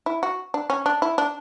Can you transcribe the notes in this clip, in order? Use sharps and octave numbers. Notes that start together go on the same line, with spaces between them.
E4
F#4
D4
C#4
D4
E4
D4